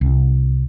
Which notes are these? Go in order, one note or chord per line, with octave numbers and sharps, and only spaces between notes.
C2